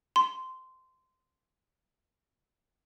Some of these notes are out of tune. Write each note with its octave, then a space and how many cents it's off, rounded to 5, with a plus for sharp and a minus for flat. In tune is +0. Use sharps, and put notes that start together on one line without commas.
C6 -15